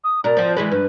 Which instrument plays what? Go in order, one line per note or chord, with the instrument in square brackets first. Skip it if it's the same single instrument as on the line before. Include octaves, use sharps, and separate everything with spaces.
[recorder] D#6
[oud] B2 A#4 [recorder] D5
[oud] F3 C4
E3 G#3 B4
[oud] G2 [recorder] B4